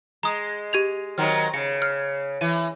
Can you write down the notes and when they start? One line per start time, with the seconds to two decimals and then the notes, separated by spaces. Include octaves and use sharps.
0.23 G#3 A#5 D#6
0.73 G4 G#6 F7
1.18 D#3 F#3 C4 F6
1.54 C#3 A#6 C#7
1.82 F6
2.41 E3 D#7